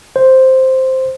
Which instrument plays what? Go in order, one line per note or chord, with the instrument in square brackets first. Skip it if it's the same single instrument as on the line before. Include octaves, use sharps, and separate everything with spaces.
[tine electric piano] C5